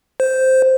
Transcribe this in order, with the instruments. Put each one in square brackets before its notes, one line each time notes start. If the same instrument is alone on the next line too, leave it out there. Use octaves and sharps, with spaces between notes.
[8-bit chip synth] C5